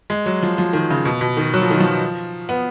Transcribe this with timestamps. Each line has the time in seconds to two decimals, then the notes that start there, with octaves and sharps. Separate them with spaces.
0.10 G#3
0.26 F#3
0.43 F3
0.58 F3
0.73 D#3
0.90 C#3
1.05 B2
1.21 B2
1.37 D#3
1.54 F#3
1.62 F3
1.71 D#3
1.80 F3
2.49 B3